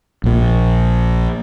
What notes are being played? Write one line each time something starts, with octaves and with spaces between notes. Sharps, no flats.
A#1 A#2